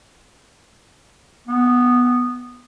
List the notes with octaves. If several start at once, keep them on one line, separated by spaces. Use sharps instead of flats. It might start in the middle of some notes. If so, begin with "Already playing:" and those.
B3